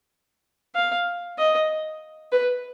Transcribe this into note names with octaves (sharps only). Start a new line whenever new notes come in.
F5
D#5
B4